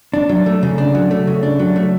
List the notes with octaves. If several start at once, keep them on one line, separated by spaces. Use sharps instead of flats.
D4
F#3
A3
C#3
D4
F#3
A3
C#3
D4
F#3
A3